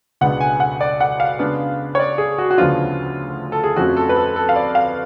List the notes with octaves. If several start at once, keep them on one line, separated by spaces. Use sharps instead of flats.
C#2 B2 G#3 B3 D4 F#5
G#5
F#5
D5
F#5
F5
C#3 G#3 B3 D4
C#5
D5
G#4
F#4
F#4
D2 C#3 F3 B3 D4 F4
A4
G#4
F2 F3 A3 C#4 F#4
A4
B4
A4
A4
F5
D5
F5